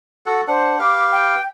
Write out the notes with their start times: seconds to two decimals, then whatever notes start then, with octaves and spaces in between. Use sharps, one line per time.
0.26 F#4 A4 F#5
0.48 D4 C5 F#5
0.79 G4 B4 F5 D6
1.12 G5